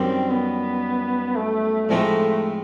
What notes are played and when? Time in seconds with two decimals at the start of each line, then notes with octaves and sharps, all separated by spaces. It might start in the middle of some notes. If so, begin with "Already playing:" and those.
Already playing: F#2 D#3 G3 C4
0.30 B3
1.35 A3
1.88 A2 F3 G#3 A3 C4 D#4